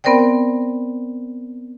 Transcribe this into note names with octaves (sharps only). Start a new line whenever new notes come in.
B3 C4 A#4 C5 D5 G5